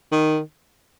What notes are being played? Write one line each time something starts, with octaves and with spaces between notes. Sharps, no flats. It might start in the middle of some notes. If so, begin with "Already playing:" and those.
D#3